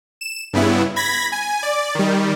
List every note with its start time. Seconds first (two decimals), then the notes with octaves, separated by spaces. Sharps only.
0.21 E7
0.53 G2 C#3 B3 E4
0.96 B5 G#6 A#6 B6
1.32 G#5
1.63 D5
1.95 D#3 G3